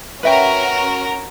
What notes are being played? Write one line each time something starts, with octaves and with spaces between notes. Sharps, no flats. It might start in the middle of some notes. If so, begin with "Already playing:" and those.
C#4 F#4 A#4 B4 E5 G5